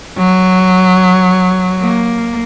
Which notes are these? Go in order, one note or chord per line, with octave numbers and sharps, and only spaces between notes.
F#3
A#3